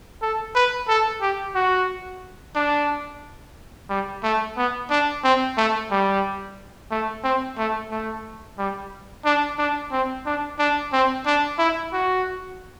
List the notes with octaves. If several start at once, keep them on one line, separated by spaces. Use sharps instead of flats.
A4
B4
A4
G4
F#4
D4
G3
A3
B3
D4
C4
A3
G3
A3
C4
A3
A3
G3
D4
D4
C4
D4
D4
C4
D4
E4
F#4